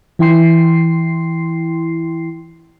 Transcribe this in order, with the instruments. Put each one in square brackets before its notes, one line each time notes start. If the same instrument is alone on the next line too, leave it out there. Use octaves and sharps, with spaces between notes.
[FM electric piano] E3 E4 G5 C6 C7